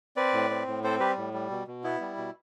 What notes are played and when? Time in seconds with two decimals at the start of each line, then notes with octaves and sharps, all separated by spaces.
0.16 C4 B4 D5
0.34 A2
0.50 C4
0.67 A2
0.84 C4 A4 C5
1.00 G3 G4 B4
1.17 A2
1.33 G3
1.50 B2
1.67 B2
1.84 B3 E4
2.01 G3
2.17 B2